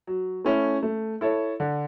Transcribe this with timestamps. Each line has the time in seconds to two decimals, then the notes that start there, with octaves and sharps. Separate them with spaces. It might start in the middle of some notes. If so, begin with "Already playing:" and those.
0.07 F#3
0.44 A3 C#4 E4
0.83 A3
1.21 E4 A4 C#5
1.60 D3